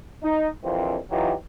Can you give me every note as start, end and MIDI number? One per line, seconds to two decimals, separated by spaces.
0.23 0.48 63
0.63 0.96 34
0.63 0.96 41
0.63 0.96 46
0.63 0.96 52
0.63 0.96 60
1.10 1.33 52
1.10 1.33 54
1.10 1.33 63
1.10 1.33 65
1.10 1.33 67